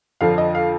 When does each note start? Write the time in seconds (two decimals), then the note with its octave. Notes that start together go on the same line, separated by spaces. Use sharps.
0.21 F2 D3 F3 F5
0.38 D#5
0.55 F5